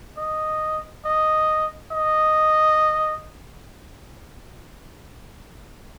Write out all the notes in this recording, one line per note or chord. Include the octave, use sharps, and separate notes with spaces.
D#5
D#5
D#5